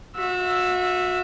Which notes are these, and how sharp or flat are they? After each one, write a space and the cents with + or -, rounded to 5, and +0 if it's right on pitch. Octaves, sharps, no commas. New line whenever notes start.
F#4 -35 E5 +0